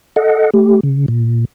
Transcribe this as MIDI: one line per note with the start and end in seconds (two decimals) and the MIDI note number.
0.16 0.50 69
0.16 0.50 75
0.16 0.50 78
0.54 0.80 57
0.54 0.80 67
0.83 1.06 49
1.08 1.45 46